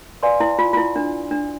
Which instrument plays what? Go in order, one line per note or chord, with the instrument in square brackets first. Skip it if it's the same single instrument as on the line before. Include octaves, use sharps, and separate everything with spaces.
[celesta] B4 D5 F5 G#5 C6
[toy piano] E4
F4
F4
E4
D4
D4